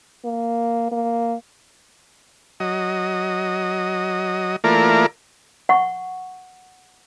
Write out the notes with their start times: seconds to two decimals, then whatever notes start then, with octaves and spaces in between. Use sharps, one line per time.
0.25 A#3
0.92 A#3
2.60 F#3 D#5
4.64 E3 A3 A#3 F4 A#4 D5
5.69 F#5 C#6